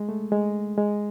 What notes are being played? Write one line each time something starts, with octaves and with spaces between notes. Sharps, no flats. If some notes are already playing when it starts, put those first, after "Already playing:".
Already playing: G#3
A3
G#3
G#3